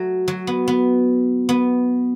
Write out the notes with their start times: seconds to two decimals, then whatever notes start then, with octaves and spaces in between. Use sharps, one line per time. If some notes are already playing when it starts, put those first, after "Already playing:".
Already playing: F#3 A3
0.28 F#3
0.47 B3
0.68 B3
1.49 B3